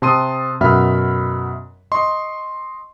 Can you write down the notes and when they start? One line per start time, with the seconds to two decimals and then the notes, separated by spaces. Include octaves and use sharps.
0.02 C3 A5 C6 D#6 D#7
0.61 F#2 B2 E5 F#5 B5 F6
1.92 D#5 C6 C#6